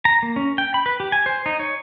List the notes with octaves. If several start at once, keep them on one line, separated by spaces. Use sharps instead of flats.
A#5
A#3
C#4
G5
B5
B4
G4
G#5
C5
D#4
C#5